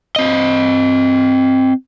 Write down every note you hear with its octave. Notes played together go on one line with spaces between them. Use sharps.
C4 D#5